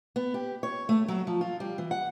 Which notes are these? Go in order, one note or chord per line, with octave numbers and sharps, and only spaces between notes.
B3
G4
C#5
A3
F#3
F3
F4
G3
E3
F#5